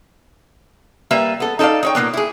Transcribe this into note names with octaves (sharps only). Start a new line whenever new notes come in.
G3 A#3 B4 E5
B3 A4
D#4 A4 C#5 D5 F5
D#4 C#5 G5
A#2 E3 A#3 B3
E4 G#4